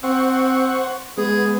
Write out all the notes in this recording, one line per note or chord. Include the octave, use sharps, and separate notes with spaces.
C4 C5 F#5 C#6
G#3 B3 G#4